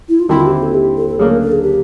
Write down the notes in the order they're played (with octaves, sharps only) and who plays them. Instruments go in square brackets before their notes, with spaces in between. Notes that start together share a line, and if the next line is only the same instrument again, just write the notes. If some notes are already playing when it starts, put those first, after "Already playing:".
[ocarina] E4
F4
[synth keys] D#2 D3 G3 C4 E4 [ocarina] F#4
[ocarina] F4
G4
F#4
A4
G4
A4
A4
[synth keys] D2 C#3 F#3 A#3 D4 [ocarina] G#4
[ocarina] A#4
A4
G#4
G4